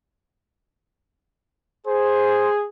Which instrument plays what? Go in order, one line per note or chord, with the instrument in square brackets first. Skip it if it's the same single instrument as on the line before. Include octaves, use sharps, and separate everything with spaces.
[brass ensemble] G#4 [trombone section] C5